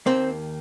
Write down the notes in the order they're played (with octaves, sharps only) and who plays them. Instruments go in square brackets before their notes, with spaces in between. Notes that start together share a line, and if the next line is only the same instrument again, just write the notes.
[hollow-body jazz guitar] D#2 D#3 A#3 C4 C5